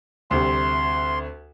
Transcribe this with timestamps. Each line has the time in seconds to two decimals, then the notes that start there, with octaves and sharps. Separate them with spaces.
0.31 D2 C3 G3 C6